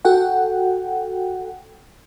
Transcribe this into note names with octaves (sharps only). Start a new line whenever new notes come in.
F#4 A4 F#5 G5